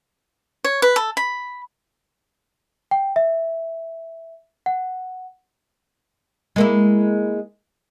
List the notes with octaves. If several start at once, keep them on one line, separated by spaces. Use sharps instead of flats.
C#5
B4
A4
B5
G5
E5
F#5
G#3 A#3 E4